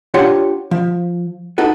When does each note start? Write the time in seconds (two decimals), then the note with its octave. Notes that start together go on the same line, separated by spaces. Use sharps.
0.14 D4 F4 G4 C#5 F#5 C6
0.71 F3
1.58 D#4 F#4 A4 B4